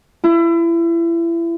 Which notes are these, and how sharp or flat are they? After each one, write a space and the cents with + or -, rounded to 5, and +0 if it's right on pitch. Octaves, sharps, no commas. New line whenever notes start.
E4 +30